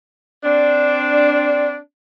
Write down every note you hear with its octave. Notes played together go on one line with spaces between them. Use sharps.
C4 D4